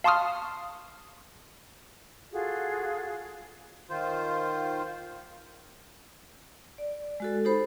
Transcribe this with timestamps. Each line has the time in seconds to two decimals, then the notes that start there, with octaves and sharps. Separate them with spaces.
0.04 F5 A5 C6 C#6 D#6 F6
2.32 F4 F#4 G#4 A4
3.90 D#3 F4 C5
6.78 D5
7.20 G#3 F#4 A4
7.45 D#4 G4 A4 C5 B5